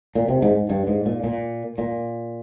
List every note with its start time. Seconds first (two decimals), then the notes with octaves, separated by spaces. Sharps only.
0.15 A#2
0.29 C3
0.42 G#2
0.69 G2
0.87 G#2
1.06 A#2
1.24 A#2
1.78 A#2